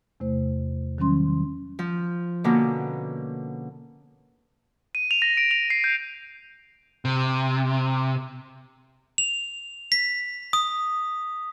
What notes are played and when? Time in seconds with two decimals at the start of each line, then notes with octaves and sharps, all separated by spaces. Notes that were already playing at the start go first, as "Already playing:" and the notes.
0.20 E2 C3 A3 C5
0.98 D#3 F#3 G3 C#4 C6
1.79 F3
2.44 B2 D3 A#3 B3 C#4
4.95 D#7
5.11 F7
5.22 A#6
5.37 D7
5.51 F7
5.70 C7
5.84 G6
7.05 C3
9.18 F7
9.92 B6
10.53 D#6